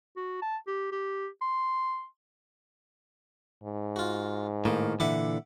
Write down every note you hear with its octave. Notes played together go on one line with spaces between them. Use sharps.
F#4
A5
G4
G4
C6
G#2
F4 F#4
A2 D#3 A#3
A#2 D3 E3 E5 F#5 D6